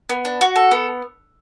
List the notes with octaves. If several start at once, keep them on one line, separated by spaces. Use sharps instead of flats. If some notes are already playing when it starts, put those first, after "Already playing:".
B3
D4
F#4
A4
B3